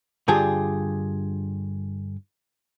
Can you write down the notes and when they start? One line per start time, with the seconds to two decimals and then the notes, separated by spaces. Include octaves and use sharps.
0.28 G2 D3 F4 G4 G#4